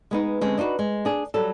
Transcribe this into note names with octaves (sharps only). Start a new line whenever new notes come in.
G#3 B3 D#4
D3 G#3 C4 C#4
D4 D#4 F4 F#4 B4
G#3
D4 G#4
F#3 G3 A4